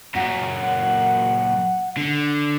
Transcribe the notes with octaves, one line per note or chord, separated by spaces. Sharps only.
F#2 A#2 F#5
D3